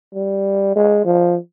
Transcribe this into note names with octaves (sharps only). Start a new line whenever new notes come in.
G3
G#3
F3